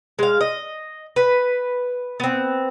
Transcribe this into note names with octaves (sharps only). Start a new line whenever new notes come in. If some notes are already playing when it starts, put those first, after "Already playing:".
G#3 F5
D#5
B4
B3 C4